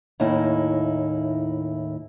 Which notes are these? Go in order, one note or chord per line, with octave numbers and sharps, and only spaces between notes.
D#2 A2 C#4 D#4 E4